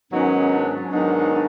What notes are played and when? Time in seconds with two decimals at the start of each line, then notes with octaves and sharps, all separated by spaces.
0.12 G#2 D#3 F#3 B3 C#4 D#4
0.52 D4
0.81 C#4
0.91 G#2 D#3 F#3 B3 D4 D#4
1.32 D4